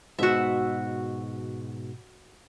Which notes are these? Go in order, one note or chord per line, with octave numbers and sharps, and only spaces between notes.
G#2 B2 F#4 E5